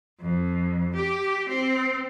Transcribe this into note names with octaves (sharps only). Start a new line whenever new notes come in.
F2
G4
C4